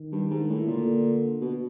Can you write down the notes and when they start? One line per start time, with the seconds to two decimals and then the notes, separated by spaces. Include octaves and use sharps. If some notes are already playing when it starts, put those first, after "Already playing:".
Already playing: D#3
0.12 G2
0.30 G#2
0.49 A2
0.67 A#2 D3
1.41 B2